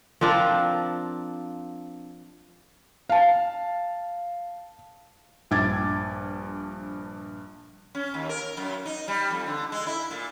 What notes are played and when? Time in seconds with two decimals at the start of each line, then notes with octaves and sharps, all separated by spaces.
0.21 F3 C4 D4 A#4
3.09 F5 A5
5.51 A#1 G2 D6 G#6 A6
7.95 C#4
8.14 D#2
8.29 A#4
8.57 F#2
8.86 D#4
9.08 G3
9.30 F2
9.47 D3
9.72 G#3
9.87 E4
10.11 A#2